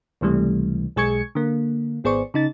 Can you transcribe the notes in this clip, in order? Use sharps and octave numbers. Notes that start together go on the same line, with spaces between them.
C#2 C3 E3 G3 A3
B1 G#3 G#4 C#6 G#6 C#7
D3 A#3
G#1 B3 G#4 C5 D5 C#6
C#3 D#4 A6